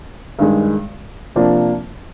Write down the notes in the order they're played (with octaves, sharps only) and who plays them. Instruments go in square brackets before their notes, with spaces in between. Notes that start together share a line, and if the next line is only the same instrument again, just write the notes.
[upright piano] G2 D#3 G#3
C3 F3 A#3 D4 F4